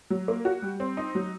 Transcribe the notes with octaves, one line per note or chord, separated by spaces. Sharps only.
F#3
A#3
F#4
G3
C4
D#4
F#3